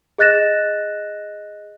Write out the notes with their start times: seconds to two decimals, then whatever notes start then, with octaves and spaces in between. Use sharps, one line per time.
0.18 G#4 D#5 F#6 A6 A#6 E7